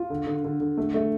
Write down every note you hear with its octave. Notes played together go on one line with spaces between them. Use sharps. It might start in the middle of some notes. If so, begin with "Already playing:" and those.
Already playing: F4
D3
D3
D3
D3
A3
A3